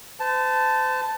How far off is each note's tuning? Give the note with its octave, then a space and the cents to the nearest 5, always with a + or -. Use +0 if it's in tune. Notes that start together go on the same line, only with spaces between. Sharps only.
C5 -40 A5 +0